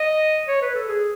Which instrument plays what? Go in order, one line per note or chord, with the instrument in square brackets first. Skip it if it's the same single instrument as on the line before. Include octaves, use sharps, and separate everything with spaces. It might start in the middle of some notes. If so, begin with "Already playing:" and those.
Already playing: [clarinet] D#5
C#5
B4
A4
G#4